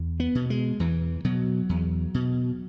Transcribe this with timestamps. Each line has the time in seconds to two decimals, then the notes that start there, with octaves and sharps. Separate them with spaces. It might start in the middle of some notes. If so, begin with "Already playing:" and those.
Already playing: E2
0.20 B3
0.35 B2
0.50 G#3
0.80 E2 E3
1.24 B2 F#3
1.69 E2
2.14 B2